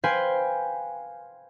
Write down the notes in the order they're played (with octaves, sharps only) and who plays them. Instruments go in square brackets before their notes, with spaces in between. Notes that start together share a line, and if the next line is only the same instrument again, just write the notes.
[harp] B4 C5 F5 G5 G#5 B5